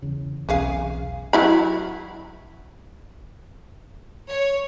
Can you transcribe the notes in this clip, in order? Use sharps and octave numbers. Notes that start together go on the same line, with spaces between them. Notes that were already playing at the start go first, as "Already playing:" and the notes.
E2 C#3
B1 E2 C3 C#4 G#4 F5
F#3 E4 B5
C#5